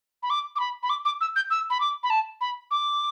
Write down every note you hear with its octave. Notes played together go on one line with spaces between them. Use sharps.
B5
D6
D6
B5
B5
D6
D6
E6
G6
E6
B5
D6
B5
A5
B5
D6